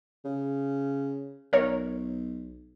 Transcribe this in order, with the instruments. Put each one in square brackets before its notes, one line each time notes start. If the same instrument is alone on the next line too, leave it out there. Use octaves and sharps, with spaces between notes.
[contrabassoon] C#3
[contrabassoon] B1 [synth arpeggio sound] A#4 C#5